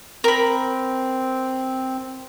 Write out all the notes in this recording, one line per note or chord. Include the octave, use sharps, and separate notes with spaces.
C4 A#4 B5